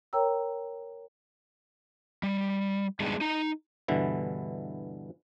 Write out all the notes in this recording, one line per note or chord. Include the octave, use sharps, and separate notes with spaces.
A#4 C#5 G5 A#5 E6
G3
G3 G#3 B3 D4 D#4 G#4
D#4 A#5
G2 B2 D3 E3 E4